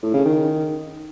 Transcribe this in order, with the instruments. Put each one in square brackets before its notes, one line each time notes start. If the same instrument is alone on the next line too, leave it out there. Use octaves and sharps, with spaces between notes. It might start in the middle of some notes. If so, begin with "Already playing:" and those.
[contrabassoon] A2
C#3
D#3